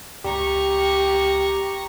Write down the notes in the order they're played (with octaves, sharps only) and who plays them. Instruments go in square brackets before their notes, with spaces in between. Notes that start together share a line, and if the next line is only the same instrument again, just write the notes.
[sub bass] C#2 [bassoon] G4 [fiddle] A#5 C#6